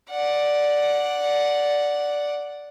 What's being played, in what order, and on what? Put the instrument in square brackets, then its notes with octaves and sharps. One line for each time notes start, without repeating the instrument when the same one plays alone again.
[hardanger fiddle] D5 F#5